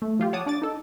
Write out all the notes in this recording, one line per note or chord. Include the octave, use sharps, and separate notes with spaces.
A3
F3 F4 G4
C#5 F#5 A5 D6 D#6
D4 D5 D6 A6
D#4 A4